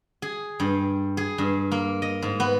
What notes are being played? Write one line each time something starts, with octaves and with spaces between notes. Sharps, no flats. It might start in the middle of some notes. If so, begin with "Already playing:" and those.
G#4
G2
G#4
G2
A#3
D#5
G#2
B3